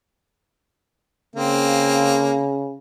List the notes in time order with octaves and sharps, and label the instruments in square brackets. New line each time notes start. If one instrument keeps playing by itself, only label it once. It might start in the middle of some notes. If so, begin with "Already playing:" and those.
[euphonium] C#3 [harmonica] A#3 C4